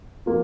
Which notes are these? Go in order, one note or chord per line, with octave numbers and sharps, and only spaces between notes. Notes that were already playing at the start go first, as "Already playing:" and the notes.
F3 A#3